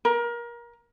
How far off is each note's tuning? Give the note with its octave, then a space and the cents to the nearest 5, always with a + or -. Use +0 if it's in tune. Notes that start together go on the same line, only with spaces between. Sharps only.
A#4 +25